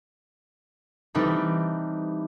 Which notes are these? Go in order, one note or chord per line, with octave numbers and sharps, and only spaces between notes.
E3 G3 C4 D#4 A4